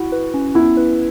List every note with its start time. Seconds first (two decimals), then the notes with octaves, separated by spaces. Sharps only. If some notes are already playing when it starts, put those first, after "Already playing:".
Already playing: E4 F#4
0.12 B4
0.34 C#4
0.55 B3 E4
0.77 B4